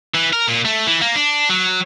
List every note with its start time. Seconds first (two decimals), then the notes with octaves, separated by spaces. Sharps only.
0.15 E3
0.33 A#4
0.48 A#2
0.65 A3
0.87 E3
1.01 A#3
1.15 D4
1.49 F#3